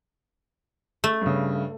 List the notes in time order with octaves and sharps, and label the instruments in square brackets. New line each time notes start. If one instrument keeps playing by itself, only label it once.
[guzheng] A3
[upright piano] G2 C#3